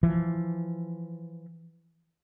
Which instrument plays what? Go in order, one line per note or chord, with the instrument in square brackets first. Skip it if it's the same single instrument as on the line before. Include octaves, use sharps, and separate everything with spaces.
[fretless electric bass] E3 F3